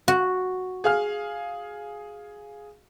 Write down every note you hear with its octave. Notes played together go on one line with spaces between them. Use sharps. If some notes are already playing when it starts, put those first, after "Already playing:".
F#4
G#4 F5 F6